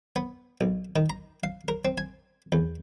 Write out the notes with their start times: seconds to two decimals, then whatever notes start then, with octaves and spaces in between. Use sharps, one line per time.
0.16 B3
0.61 B1
0.96 D#3
1.10 A#5
1.44 F5
1.68 A#4
1.85 C4
1.98 G#5
2.52 E2